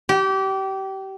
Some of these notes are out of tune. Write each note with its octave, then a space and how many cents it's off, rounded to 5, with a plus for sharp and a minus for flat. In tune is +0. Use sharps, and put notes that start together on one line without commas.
G4 -25